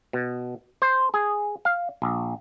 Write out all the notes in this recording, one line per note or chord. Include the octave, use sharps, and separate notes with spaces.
B2
C5
G#4
F5
A#1